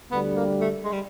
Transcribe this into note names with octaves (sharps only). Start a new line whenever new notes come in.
D2 D3 G3 B3
A#3
A3
G#3
G3